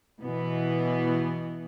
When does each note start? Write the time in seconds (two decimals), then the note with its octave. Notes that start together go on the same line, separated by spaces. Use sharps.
0.22 B2 E3 B3